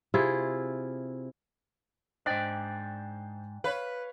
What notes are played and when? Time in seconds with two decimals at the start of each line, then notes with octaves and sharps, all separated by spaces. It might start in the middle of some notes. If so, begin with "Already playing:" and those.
0.14 C3 E4 F4 G#4
2.26 G#2 D4 C5 D5 D#5 G5 F#6
3.64 B4 C#5 F5